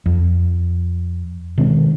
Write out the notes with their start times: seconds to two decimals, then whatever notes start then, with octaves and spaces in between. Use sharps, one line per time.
0.06 F2
1.58 B2 D#3 G#3 C4